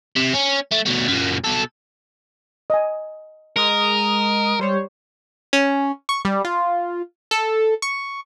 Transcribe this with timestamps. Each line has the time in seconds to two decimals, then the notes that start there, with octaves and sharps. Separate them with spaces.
0.16 C3
0.34 C#4
0.72 A3
0.86 B2 A3
1.08 F#2 A#2
1.45 B2 A4
2.70 D#5 G#5
3.56 G#3 A#4 D#6
4.59 G3 C5 C#5
5.53 C#4
6.09 C#6
6.25 G3
6.45 F4
7.31 A4
7.82 C#6